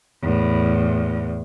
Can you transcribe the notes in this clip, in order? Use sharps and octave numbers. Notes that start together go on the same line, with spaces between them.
E2 A2